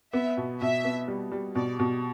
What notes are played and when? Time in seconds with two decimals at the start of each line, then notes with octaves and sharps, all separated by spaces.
0.13 B3 E5
0.37 B2
0.61 B2 E5
0.84 B3
1.08 G3
1.32 G3
1.55 B2 D5
1.79 B2